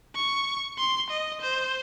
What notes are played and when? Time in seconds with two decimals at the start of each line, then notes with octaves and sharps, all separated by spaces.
0.15 C#6
0.78 C6
1.10 D#5
1.42 C5